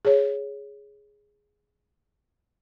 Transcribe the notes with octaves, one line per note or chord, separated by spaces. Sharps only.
G#4 C#5